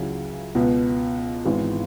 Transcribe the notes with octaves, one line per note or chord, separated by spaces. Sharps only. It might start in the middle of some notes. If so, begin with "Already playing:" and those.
Already playing: C#2 C#3 F#3 C#4 E4
C#2 B2 B3
G#1 G#2 E3 B3